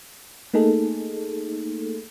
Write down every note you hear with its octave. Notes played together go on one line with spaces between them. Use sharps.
A3 A#3 D#4 G#4 A4